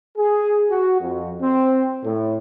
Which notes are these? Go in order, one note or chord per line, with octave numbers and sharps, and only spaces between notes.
G#4
F#4
F2
C4
A2